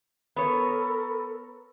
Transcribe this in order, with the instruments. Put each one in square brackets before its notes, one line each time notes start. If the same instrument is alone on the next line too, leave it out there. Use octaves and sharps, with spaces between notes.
[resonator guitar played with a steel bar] B3 C#5 [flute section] A4 A#4 B5